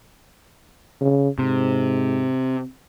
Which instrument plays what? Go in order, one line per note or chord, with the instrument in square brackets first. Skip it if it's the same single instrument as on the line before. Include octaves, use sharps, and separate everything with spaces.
[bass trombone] C#3
[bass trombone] G#2 [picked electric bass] C3